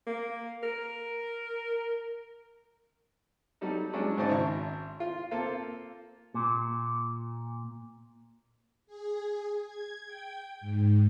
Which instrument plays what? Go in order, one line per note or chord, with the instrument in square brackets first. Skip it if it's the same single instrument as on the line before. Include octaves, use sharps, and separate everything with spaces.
[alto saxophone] A#3
A#4
[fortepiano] F#3 G3 D#4 A4
F#3 G#3 C#4 D4
G#2 C#3 C5 D5 D#5 A5
G#1 E5 C#6
F4
A#3 C4 F4 A4
[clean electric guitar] A#2
[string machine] G#4
G#6
G5
G#2